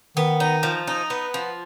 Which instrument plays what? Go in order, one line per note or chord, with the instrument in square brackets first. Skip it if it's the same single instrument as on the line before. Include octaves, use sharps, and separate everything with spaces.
[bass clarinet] D#3 [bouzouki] B3
[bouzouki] D#4
F3
D#4
B3
F3